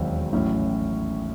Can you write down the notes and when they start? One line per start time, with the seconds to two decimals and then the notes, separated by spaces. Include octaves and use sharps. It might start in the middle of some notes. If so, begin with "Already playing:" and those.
Already playing: E1 D#2 D#3 F#3 C4
0.33 A1 A2 F#3 C#4